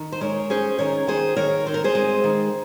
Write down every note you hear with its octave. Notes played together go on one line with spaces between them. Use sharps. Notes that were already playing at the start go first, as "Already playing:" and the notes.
Already playing: D#3
C5
G#3 A#4 C#5
C#4 G#4 C5
D#3 A#4 C#5
D#3 G#4 C5
D#3 A#4 C#5
C4 C5
A#4
G#4 C5
G#3
D#3